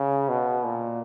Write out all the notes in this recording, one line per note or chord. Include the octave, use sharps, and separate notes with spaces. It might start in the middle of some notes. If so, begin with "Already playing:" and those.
Already playing: C#3
B2
A#2